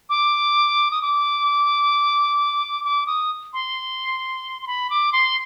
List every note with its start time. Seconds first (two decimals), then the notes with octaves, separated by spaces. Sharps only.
0.10 D6
0.91 D#6
1.02 D6
2.85 D6
3.07 D#6
3.53 C6
4.62 C6
4.67 B5
4.90 D6
5.12 C6